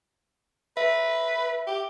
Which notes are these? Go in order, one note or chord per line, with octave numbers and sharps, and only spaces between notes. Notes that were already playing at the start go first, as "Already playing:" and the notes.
B4 E5
G4